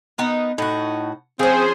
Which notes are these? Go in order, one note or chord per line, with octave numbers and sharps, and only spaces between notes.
B3 D#4 A#4
A2 D#4 F#4
F3 C4 C#4 G#4 C5